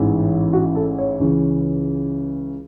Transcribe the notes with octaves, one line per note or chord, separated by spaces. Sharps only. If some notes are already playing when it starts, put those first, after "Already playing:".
Already playing: A1 G#2 E3
F#4
A4
C#5
C#2 C#3 E3